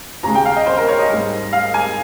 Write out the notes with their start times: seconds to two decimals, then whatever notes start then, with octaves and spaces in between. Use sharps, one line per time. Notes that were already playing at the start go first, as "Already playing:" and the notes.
0.23 D#2 C#3 G#3 A#5
0.35 G5
0.45 F5
0.56 D#5
0.66 C5
0.77 A#4
0.88 C#5
0.99 D#5
1.09 G#2 G3
1.53 F5
1.74 G#5